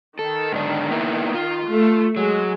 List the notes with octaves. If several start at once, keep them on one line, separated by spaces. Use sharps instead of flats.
D#3 A4
G#2 D3 D4
A#3 B3 E4
F4
A3
F#3 G#3